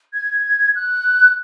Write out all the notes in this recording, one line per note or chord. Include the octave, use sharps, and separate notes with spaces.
G#6
F#6